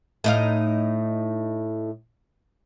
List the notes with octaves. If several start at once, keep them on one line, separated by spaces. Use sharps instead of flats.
A2 D#4 F5